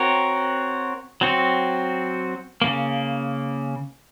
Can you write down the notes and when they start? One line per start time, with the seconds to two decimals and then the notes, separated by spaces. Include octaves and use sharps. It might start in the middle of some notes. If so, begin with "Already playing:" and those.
Already playing: C4 F#4 A#4 C#5
1.21 F#3 C4 F#4
2.62 C#3 F3 A#3